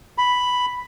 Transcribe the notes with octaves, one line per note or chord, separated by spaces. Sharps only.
B5